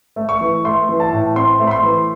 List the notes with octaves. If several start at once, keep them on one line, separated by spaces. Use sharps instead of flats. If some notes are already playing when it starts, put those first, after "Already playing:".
A3
C#6
E3
A3 C6
E3
A5
A2
C4 C6
A3
B5
C6
E3